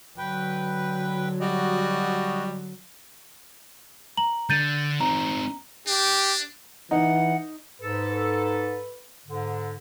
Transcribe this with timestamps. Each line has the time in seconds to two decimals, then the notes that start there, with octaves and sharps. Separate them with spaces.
0.18 D3 F#3 B4 G5
1.41 G3 F#4 D#5
4.17 A#5 F#7
4.50 D3 G6 A6 D#7
5.00 C4 D#4 A#5
5.87 D4 G4
6.91 E3 D#4 F#5
7.81 G#2 A4 B4
9.26 G#2 D3